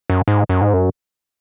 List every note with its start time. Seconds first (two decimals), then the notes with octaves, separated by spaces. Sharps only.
0.10 F#2
0.28 G#2
0.49 F#2
0.61 G#2
0.73 F#2